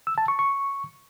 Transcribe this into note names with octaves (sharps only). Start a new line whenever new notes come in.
E6
A5
C#6
C#6